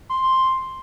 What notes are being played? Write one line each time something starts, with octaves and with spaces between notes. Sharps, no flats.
C6